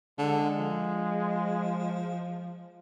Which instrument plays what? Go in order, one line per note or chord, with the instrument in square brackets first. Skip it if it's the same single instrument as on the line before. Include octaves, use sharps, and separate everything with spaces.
[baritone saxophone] D3 [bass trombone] G#3
[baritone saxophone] F3